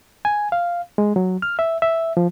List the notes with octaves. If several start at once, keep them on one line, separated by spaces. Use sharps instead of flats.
G#5
F5
G#3
F#3
F6
E5
E5
F3